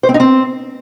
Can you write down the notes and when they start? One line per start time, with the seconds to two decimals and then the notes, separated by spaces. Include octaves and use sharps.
0.03 C5
0.09 C4
0.14 D#4
0.20 C4